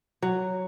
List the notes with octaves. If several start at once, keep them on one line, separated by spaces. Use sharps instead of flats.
F#3